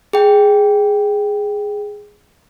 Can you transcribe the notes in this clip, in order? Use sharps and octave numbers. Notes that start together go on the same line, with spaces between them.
G#4 G5